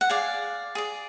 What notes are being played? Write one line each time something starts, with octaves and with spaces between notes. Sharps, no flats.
F#5
G#4 D5 F5
G#4 D5